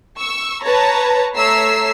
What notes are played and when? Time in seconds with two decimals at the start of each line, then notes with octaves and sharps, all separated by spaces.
0.18 C#6 E6
0.63 B4 C#5 A5 A#5
1.35 A3 C#5 A#5 E6 B6 C7